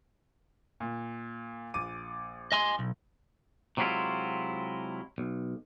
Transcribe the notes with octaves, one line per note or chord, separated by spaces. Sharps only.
A#2
A#1 D6 D#7
D#5 G#5 C6
B1
C3 F#3 G#3 D4 E4 F4
B1